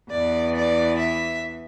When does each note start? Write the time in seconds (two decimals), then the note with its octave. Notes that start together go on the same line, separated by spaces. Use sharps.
0.11 E2 E3 D5
0.56 D5
0.99 E5